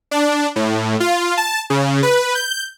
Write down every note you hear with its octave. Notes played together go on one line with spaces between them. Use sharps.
D4
A2
F4
A5
C#3
B4
G6